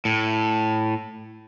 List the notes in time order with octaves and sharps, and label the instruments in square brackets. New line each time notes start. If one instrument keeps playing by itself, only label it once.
[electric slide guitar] A2